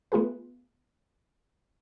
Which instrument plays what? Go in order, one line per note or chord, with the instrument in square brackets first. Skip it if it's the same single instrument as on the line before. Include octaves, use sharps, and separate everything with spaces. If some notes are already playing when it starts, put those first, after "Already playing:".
[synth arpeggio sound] A3 B3 F4 G#4 B4